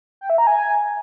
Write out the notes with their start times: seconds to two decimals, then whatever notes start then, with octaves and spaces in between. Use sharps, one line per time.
0.21 G5
0.30 E5
0.38 A#5
0.47 G#5